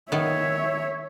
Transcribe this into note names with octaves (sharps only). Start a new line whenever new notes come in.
D#3 B3 C#5 E5